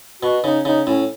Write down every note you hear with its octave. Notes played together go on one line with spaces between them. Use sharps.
B2 F#4
C#3 D#4
C#3 D#4
A2 C#4